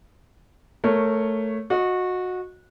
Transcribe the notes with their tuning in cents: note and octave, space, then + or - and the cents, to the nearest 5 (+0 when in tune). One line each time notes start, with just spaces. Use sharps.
A3 +0 A#4 -15 C#5 +0
F#4 -20 D#5 +0